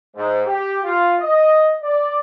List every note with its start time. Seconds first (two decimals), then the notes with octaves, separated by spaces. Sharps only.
0.15 G#2
0.46 G4
0.84 F4
1.20 D#5
1.82 D5